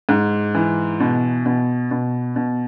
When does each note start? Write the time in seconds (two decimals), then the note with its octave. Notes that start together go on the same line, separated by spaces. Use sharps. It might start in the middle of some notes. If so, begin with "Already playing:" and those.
0.09 G#2
0.55 E3
1.00 B2
1.46 B2
1.91 B2
2.36 B2